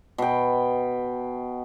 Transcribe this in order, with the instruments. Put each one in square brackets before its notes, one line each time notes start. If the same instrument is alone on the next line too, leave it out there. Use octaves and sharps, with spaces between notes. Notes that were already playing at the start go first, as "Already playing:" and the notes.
[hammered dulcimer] B2 G5